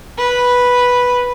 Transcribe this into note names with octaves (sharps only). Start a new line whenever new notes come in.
B4